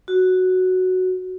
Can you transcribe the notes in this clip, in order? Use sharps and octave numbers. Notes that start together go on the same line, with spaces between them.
F#4